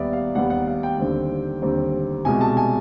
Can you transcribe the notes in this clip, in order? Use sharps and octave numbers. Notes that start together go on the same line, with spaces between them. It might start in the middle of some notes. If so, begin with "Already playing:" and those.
Already playing: D#2 D#3 G3 B3 D5 E5
F5
D#2 D#3 G3 B3 F#5
F#5
F5
G5
D#2 D3 G3 C4
D#2 D3 G3 C4
C2 B2 G#3 G#5
A5
G#5